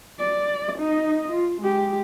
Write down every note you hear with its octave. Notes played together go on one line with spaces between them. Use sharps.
D5
D#4 D#5
F4
G#3 G4